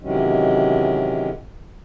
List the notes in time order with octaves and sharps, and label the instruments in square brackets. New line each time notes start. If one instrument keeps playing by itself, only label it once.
[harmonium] C3 D#3 E3 F#3 G#3 C#4